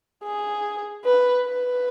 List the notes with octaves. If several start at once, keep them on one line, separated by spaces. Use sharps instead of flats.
G#4
B4
B4